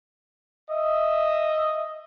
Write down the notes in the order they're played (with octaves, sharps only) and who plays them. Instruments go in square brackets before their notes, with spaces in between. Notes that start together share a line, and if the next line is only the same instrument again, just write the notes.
[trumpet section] D#5 E5